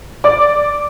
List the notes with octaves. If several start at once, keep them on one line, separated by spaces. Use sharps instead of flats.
D5 D6